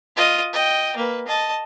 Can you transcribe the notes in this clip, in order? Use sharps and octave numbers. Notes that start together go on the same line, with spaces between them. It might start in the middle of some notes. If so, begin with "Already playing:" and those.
F4 D#5
D#5 G5
A#3 B4
D#5 A5